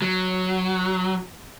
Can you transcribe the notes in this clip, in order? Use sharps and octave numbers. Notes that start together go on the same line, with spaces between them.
F#3